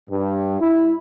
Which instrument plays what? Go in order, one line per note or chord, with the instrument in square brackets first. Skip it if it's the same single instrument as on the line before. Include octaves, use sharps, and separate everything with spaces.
[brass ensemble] G2
E4